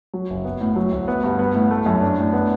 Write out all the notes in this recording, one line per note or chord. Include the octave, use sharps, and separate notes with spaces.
F#3
F#1
B3
A2
F#3
D2
B3
G2
B3
A2
A3
F#2
D4
A2
B3